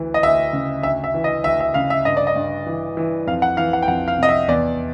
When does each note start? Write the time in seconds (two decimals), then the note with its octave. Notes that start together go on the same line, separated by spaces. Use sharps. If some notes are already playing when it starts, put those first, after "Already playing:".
Already playing: D2 E3
0.14 D#5
0.23 D2 E5
0.53 C#3
0.83 D2 E5
1.04 E5
1.14 E3
1.24 D#5
1.44 D2 E5
1.60 E5
1.74 C#3 F5
1.90 E5
2.05 G2 D#5
2.17 D5
2.27 D#5
2.36 G2
2.67 E3
2.97 E3
3.27 F2 F5
3.42 F#5
3.57 E3 F5
3.73 F#5
3.82 G5
3.88 F2 F#5
4.08 F5
4.19 C3 D#5
4.29 E5
4.49 E2 D5